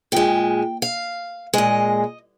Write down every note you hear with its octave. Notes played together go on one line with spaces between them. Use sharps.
A#2 G#3 G5
F5
A#2 G#3 D#5